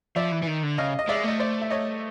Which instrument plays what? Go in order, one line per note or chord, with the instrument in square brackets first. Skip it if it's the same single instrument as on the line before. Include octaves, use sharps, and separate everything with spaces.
[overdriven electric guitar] F3 [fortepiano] D5 E5
[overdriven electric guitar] E3
E3
D#3
D3
[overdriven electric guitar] C#3 [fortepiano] D#5 F5
[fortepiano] D#5
[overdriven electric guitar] G#3 [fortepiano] D5 E5
[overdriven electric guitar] A3 [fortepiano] D#5
[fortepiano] C5 D5
E5
C#5 D#5